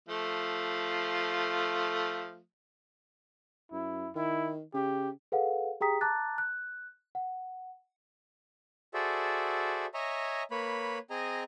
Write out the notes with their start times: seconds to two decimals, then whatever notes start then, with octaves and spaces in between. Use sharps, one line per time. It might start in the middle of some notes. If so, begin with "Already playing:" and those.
0.09 F3 A3 F4
3.72 F#2 E4
4.16 D#3 E4
4.74 C#3 G4
5.32 G#4 A4 B4 F5 F#5
5.81 G4 G#4 G5 A#5 D#6 B6
6.01 A5 A#5 D6 F#6 A6
6.38 F#6
7.15 F#5
8.94 F#4 G#4 A4 C5 D5 E5
9.94 C#5 D#5 E5 G#5 A#5
10.51 A#3 B4 C#5 B5
11.10 C4 G#4 D#5 G#5 A#5